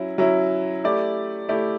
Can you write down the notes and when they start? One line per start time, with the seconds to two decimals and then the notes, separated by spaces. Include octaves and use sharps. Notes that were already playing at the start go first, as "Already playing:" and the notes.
Already playing: F#3 C#4 E4
0.18 F#3 C#4 E4
0.84 A3 E4 G4 D5
1.49 A3 E4 G4 D5